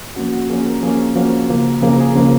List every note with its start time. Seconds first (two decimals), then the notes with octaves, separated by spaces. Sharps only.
0.16 F3 A#3 C#4 F#4
0.33 F#4
0.50 F3 A#3 C#4 G#4
0.67 A#4
0.83 F3 A#3 C#4 G#4
1.16 F3 A#3 C#4 F#4
1.49 C#3 F3 A#3
1.82 C#3 F3 A#3 G#4
1.91 A#4
2.00 G#4
2.16 C#3 F3 A#3